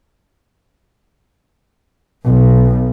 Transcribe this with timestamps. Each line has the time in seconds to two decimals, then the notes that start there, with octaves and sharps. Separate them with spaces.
2.25 B1